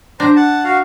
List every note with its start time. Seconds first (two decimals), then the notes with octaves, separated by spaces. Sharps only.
0.20 D4 C5 A#5
0.36 F#5 A5
0.64 F#4 F5